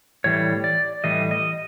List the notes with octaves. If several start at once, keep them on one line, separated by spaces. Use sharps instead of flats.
A2 E3 G3 C#5
D5
A2 E3 G3 D#5
D#5